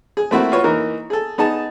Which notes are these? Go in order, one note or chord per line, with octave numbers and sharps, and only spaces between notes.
G#4
A3 A#3 C4 E4 F#4
F4 F#4 B4 C#5
E3 A#3 D#4 A#4
G#4 A4
B3 D#4 G#4 A5